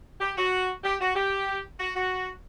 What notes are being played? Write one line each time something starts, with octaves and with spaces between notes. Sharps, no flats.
G4
F#4
G4
F#4
G4
F#4
F#4